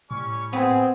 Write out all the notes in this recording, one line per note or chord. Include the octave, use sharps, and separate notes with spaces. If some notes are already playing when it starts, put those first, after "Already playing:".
A2 G3 C#4 C#6
B3 C4 G#4